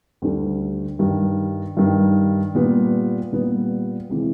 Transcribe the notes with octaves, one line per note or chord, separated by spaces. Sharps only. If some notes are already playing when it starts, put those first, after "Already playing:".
D2 D3 G3
G2 D#3 G3
G2 D#3 G3
A#2 G3 B3
A#2 G3 B3
C3 E3 G#3